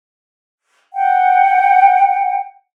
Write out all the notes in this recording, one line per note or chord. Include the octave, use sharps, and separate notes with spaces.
F#5 G5